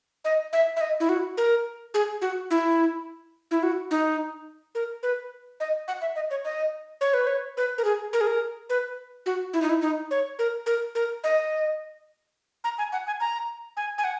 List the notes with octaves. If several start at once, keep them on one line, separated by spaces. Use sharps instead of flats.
D#5
E5
E5
D#5
E4
F#4
A#4
G#4
F#4
E4
E4
F#4
D#4
A#4
B4
D#5
F#5
E5
D#5
C#5
D#5
C#5
B4
C#5
B4
A#4
G#4
A#4
G#4
A#4
B4
F#4
E4
D#4
E4
D#4
C#5
A#4
A#4
A#4
D#5
A#5
G#5
F#5
G#5
A#5
G#5
G#5
F#5